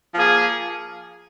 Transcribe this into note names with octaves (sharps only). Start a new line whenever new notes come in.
F3 A#3 G#4